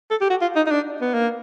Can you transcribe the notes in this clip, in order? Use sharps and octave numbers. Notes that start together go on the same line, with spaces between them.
A4
G4
F#4
F4
D#4
D#4
D4
B3
A#3